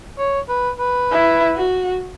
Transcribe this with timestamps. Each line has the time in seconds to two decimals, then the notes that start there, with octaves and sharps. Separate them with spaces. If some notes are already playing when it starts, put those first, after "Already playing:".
0.19 C#5
0.49 B4
0.79 B4
1.11 E4
1.56 F#4